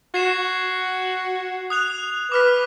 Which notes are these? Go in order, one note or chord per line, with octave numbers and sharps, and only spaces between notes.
F#4 G#6 C7 E7
D#6 F#6 F7
B4 D6 F6 B6